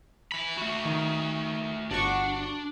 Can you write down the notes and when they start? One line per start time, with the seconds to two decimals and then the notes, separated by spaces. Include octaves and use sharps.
0.32 E3 B5
0.57 A3 F#4
0.85 D#3
1.91 G1 D4 F#4 C#6